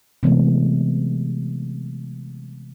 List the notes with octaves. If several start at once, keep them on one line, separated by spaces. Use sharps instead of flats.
C3 E3 F#3 G#3 A3 B3